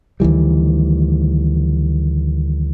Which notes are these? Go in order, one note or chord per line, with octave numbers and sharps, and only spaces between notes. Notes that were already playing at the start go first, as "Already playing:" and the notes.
D2 D#3 E3 G3